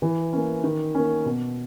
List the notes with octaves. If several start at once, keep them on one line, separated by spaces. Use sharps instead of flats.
E3
A#3 C#4
D#3
A#3 C#4
B2